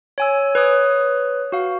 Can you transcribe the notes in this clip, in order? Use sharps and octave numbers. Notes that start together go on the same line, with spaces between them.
C#5 G#5 E6
B4 C#5 D#6
F#4 F5